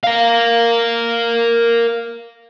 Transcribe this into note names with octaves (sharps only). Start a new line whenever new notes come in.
A#4 F5